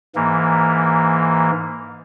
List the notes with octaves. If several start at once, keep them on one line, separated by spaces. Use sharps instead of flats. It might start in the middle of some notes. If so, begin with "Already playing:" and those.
G#2 E3 A#3